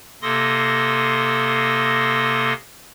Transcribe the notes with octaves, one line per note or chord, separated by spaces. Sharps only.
C3 A#3 A4 C6 D#6 A#6